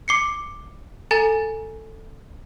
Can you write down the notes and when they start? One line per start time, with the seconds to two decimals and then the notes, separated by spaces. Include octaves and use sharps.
0.08 D6 C7 C#7
1.11 A4 G#5 A#5 A6